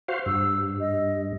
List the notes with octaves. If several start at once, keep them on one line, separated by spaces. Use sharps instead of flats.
F#4 C5 F5
G2 E6
D#5